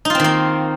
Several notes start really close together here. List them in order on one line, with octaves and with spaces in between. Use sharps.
D#4 F4 C4 D#3 A#3